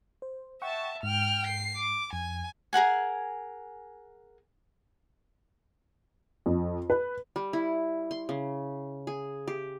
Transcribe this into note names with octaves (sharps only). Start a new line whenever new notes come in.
C5
E5 F#5 G5 A5 C#6
G#2 G5 F6
C7
D6
F2 G#5
G#4 A#4 F#5 G#5
F2
B4
G3
E4
C6
C#3
G#4
G4